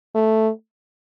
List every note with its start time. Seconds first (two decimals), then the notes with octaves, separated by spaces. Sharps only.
0.15 A3